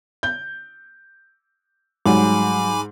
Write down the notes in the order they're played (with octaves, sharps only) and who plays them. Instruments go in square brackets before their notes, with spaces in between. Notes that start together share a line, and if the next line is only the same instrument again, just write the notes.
[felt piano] G6
[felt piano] G#2 [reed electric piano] F#3 G3 [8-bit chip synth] G#5 B5 D6